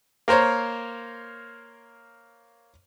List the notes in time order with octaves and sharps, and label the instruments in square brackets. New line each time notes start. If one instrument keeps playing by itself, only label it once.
[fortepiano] A#3 A#4 C5 C#5